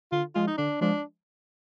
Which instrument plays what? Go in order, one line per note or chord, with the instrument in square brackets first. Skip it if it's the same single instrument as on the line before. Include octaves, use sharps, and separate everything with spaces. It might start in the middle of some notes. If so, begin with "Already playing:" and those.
[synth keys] D3 [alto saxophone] F4
[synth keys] F3 G#3 [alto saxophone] F4
[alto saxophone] D#4
[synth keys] D3 [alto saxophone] D4
[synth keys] F3 G#3 [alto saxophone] D4